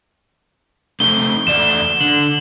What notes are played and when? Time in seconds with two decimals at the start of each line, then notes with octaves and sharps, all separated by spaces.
1.00 A3 C4 D#4 G7
1.47 E2 A3 D5 E7
2.01 D3 F#7